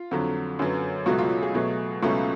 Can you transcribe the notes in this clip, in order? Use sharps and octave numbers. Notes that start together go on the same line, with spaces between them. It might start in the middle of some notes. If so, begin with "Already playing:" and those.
Already playing: F4
F2 D3 F#3
F#2 D3 F#3 B3
C#2 B2 F#3 A3 F#4
F4
G#4
B2 F#3 A3
C#2 B2 F#3 A3 C#4